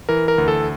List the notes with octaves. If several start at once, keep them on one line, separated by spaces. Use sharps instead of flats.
E3 A#4
A#4
D2
A4